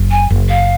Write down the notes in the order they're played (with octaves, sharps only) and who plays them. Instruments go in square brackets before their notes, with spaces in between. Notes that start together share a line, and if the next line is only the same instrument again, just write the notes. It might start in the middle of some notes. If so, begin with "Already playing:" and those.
Already playing: [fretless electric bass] F#1
[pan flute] G#5
[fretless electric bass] F#1
[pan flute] F5